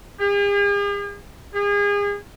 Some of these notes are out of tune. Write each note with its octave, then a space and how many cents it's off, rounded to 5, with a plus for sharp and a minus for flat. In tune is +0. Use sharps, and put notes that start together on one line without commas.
G#4 -45
G#4 -35